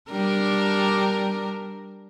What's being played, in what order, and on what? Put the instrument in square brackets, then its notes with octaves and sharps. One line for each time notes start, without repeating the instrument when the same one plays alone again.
[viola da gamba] G3 D4 A#4